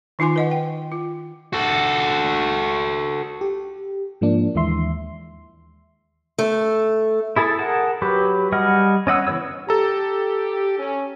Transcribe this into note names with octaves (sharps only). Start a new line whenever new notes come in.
D#3 D#4 F4 G#5 C6
B4 D#5 F#5
G5
F4
F#4 A4
G4
G#2 F3 A#3 D4
D#2 E3 G#3 E5 C6
A3
E4 G#4 A4 A5
G#4 A#4 F#5 A5
F#3 G4 B4
G3 G#4 D#5 F#5 F6
C#4 D#5 F#5 E6
C#3 E3 B3 C#5 E6
G4 A4 A#5
C#4